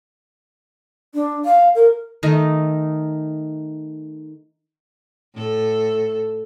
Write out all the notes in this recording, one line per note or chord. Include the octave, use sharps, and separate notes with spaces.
D4
F5
A#4
D#3 A3 D#4
A2 A4